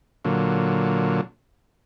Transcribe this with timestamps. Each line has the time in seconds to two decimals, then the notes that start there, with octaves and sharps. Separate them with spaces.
0.25 A#2 D3 F#3